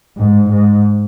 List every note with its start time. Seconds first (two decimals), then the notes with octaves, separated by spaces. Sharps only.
0.16 G#2
0.49 G#2